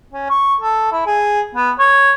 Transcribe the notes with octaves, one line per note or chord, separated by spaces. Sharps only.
C#4
C#6
A4
E4
G#4
B3
C#5